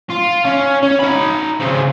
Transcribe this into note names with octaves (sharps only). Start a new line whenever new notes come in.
F4
C#4
C#4
D#4 B5
C#3 C4